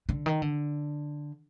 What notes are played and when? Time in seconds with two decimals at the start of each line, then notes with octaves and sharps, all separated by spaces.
0.09 D3
0.26 D#3
0.42 D3